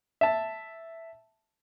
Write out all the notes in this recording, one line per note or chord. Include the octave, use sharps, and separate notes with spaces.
E5 A5